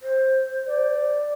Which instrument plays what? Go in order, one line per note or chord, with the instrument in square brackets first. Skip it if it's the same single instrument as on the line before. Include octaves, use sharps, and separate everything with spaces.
[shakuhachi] C5
[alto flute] D5